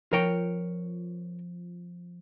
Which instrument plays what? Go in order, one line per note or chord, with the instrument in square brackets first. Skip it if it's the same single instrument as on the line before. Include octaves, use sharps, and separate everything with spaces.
[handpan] F3 [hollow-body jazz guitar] A#4 C#5 G5